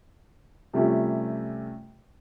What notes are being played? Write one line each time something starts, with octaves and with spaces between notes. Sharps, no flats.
C3 F3 G3 A3 C#4 G4